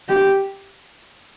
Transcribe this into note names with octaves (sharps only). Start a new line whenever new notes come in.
G4